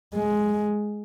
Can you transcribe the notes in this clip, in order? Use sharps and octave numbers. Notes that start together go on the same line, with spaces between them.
G#3